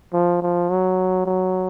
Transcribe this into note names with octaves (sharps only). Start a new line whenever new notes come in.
F3
F3
F#3
F#3